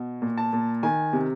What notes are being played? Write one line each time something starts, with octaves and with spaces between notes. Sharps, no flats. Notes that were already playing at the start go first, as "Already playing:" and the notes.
Already playing: B2
A#2
A5
A#2
D#3 G#5
C3